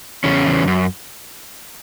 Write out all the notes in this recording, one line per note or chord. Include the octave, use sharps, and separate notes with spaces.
E2 C#3 C#4
E2
F#2